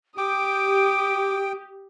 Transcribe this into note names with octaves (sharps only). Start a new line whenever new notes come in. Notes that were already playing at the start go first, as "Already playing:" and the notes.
G4 G5 D6 D#6 D7